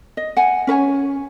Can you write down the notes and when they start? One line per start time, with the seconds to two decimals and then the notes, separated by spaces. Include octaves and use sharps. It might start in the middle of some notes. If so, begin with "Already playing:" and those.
0.17 D#5
0.37 F#5 G#5
0.67 C#4 B4 C#5 G#5